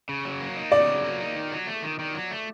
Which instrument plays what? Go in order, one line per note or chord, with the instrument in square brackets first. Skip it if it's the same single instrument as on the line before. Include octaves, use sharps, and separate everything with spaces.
[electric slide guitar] C#3
F#3
A#3
D#4
[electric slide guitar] C#3 [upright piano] D5
[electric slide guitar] F#3
A#3
D#4
D#3
F#3
A3
D#3
D#3
F#3
A3